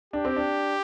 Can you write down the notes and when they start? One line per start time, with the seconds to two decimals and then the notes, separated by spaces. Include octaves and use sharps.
0.13 D4 G4
0.25 C4
0.36 D4